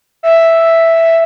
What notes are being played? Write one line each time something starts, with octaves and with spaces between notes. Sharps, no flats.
E5